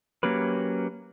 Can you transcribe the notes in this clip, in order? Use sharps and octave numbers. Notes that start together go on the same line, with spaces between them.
F#3 A#3 C#4 G4 B4